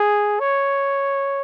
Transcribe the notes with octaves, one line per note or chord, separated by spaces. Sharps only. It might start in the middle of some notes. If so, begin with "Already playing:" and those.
Already playing: G#4
C#5